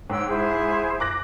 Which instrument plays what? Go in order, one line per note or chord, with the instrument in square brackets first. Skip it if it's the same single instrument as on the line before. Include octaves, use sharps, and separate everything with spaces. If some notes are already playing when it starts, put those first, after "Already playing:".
[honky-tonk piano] G#2 [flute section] C#5 G5 E6
[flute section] E4 G#4 C5
[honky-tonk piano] D6 F#6 A#6